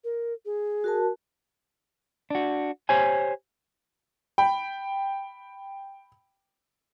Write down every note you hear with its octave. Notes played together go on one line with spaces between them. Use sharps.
A#4
G#4
F#4 A#4 A5
D4 F#4
G4 C5 C#5 G#5
G5 B5